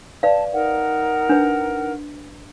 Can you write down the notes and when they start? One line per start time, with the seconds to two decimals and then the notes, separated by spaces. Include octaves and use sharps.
0.23 B4 D5 F5 A5
0.53 D#4 A#4 F#5
1.29 D4 B4